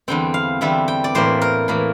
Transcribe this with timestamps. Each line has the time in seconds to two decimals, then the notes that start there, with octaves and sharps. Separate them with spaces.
0.08 E2 D3 G3 C4 G5
0.34 F5
0.61 E2 D3 G3 C4 E5
0.88 G5
1.04 D5
1.15 A2 E3 A#3 C5
1.41 A#4
1.68 A2 E3 A#3